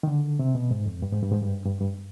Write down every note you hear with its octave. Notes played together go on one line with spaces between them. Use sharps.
D#3
D3
C3
B2
G#2
F2
G2
G#2
G2
G#2
G2
G2
G2